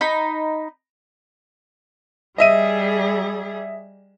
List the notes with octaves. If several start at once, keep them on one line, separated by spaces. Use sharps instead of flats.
D#4 B5
G3 G#4 D#5 E5 D#7